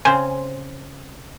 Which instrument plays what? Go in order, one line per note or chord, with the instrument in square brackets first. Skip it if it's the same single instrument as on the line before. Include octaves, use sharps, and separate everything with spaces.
[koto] C#3 C4 C5 [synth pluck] G#5